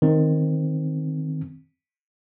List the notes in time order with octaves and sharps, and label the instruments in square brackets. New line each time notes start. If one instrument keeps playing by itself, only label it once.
[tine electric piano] D#3 C4